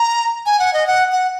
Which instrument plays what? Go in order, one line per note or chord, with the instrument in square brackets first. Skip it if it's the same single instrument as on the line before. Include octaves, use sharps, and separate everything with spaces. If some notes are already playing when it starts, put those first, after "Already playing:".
Already playing: [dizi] A#5
G#5
F#5
D#5
F#5
F#5